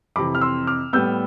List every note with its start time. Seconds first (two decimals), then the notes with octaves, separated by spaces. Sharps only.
0.16 F2 C3 E3 B5 D6
0.35 F6
0.41 C6 E6
0.67 D6 F6
0.93 A2 G3 B3 E6 G6